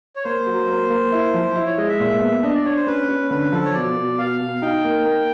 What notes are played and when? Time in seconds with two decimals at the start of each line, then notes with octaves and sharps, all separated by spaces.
0.16 C#5
0.24 A#3 C5
0.46 F#3
0.68 A#3
0.90 A#3
1.12 E4
1.34 F3
1.56 E4
1.66 C#5
1.77 G#3 D#5
1.89 E5
2.00 A#2
2.21 B3
2.43 D4 D#5
2.54 D5
2.65 D4 C#5
2.76 C5
2.87 C#4 B4
3.09 C#4
3.31 D3 B4
3.52 F3 A4
3.65 C#5
3.74 B2 D5
3.96 B2
4.18 B2 F5
4.40 B2
4.62 D#4 G5
4.84 A#3
5.06 A#3